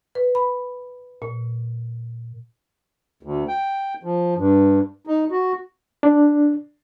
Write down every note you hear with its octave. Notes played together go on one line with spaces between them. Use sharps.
B4
B5
A#2
D2
G5
F3
G2
D#4
F#4
D4